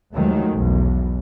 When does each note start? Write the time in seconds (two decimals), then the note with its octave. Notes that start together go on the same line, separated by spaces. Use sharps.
0.14 D#2 D#3 F3 F#3 G#3 A3
0.52 B1 E2